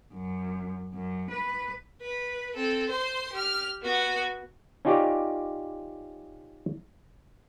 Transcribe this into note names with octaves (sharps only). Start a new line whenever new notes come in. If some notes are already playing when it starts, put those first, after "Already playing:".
F#2
F#2
B4
B4
C4 A4
C5 C6
G4 F6
B3 F#4
C#4 D#4 F4 G4 C#5 D5